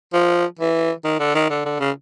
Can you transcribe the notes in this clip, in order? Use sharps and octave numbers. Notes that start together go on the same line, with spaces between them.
F3
E3
D#3
D3
D#3
D3
D3
C#3